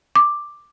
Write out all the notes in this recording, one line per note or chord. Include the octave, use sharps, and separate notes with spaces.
D6